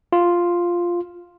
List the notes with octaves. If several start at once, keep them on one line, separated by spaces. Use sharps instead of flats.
F4